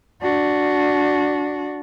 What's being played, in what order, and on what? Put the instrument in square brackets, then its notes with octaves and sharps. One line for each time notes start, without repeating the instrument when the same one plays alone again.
[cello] D4 F#4